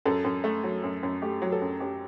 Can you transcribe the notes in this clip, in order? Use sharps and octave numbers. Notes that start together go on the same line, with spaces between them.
F#2 A4
F#2
A3
F#3
F#2
F#2
A3 G4
F#3
A4
F#2
F#2 G4